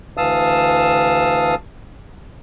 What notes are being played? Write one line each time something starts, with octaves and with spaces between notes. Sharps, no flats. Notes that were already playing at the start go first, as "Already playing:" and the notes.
D2 E3 F5 A5 D#6 E6